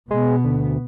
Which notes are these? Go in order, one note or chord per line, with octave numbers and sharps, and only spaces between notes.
B2 G#3 B3
D2